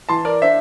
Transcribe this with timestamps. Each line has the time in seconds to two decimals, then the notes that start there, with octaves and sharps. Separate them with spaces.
0.09 E3 A5 C6
0.25 A#4 D5
0.42 D4 C5 E5